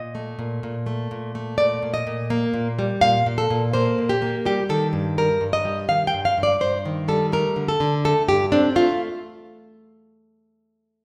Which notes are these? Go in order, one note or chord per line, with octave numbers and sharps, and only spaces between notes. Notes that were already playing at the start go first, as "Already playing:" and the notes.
Already playing: A#2 D#5
A3
A#2
A#2
A3
A#2
A3
A#2 D5
A#2
D#5
A#2
A#3
A#2
G3
A#2 F5
A#2
A4
A#2
A#3 C5
A#2
G4
A#3
G3 G4
D#3 A4
G2
G3 A#4
G2
D#5
G3
D#3 F5
G5
G2
F5
G2
D5
G2 C5
D#3
G3 A4
A3 A#4
D3
A4
D3
A3 A4
G2 G4
C4 D4
A3 F4